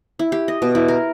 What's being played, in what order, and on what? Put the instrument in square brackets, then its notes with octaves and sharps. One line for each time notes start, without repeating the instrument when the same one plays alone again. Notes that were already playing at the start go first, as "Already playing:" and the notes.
[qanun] E4
G4
D#5
B2
E4
A#4